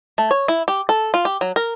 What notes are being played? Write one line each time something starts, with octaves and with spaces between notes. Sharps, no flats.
A3
C#5
E4
G4
A4
F4
G4
F#3
A#4